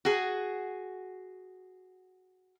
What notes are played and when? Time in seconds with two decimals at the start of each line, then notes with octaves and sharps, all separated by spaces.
0.05 F#4 G#4